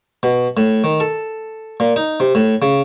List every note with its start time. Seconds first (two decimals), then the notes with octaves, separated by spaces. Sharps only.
0.23 B2
0.57 A2
0.84 D#3
1.00 A4
1.80 A#2
1.96 D#4
2.20 C3
2.35 A2
2.62 C#3